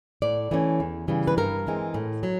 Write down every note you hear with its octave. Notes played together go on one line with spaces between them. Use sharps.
A2 D5
E3 A3 C#4
E2
C#3 E3 G3
B4
G2 A#4
E3 G#3 C4
A2
F#3